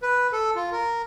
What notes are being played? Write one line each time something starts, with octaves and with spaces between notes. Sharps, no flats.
B4
A4
F4
A#4